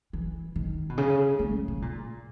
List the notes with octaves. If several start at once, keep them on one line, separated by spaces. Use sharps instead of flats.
E3
D#3
B2
C#3
A#3
D#3
C#3
A#2